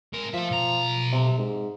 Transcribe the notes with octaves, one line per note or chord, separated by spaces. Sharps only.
G#2 A#4
F3 A4 E5
B1 A#5
C3
G#2